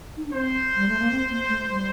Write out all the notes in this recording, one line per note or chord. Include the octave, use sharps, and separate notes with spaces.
D#4
D4
C4 C5
G3
A3
A#3
C4
A#3
A3
G3